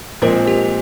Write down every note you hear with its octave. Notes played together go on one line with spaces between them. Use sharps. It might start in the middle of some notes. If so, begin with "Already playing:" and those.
A#2 F3 G#3 C4 A#4
G4